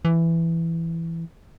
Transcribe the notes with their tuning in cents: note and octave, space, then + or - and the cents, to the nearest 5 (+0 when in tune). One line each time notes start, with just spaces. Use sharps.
E3 +10